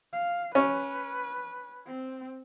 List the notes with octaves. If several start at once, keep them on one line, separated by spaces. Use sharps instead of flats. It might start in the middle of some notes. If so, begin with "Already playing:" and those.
F5
C#4 B4
C4